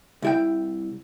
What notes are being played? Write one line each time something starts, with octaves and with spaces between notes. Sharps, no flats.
C2 E4 G5